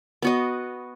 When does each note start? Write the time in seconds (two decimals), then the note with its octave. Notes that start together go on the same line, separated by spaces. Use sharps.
0.22 B3 F#4 D#5